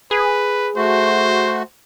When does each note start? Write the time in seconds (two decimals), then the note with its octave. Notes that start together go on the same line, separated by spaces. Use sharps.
0.11 G#4 B4
0.76 A3 F#4 C5